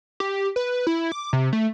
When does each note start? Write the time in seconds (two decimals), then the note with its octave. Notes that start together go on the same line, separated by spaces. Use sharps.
0.20 G4
0.56 B4
0.87 E4
1.12 D6
1.33 C3
1.53 A3